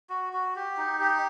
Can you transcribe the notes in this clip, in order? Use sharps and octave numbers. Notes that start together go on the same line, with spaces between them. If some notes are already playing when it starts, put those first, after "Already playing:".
F#4
F#4
G4
D#4
G4